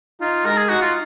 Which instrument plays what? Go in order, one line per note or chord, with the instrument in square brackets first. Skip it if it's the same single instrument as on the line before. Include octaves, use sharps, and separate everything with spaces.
[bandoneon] D#4 [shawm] F4
[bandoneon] G#3 [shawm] A#4
[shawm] G#4
[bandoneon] D#4 [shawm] F#4
[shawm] F4